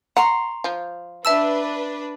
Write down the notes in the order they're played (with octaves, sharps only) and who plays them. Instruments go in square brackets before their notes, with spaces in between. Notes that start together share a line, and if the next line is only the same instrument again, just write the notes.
[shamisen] F#5 [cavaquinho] A#5 C6 C#6
[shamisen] F3
[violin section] D4 B4 [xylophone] E5 A5 E6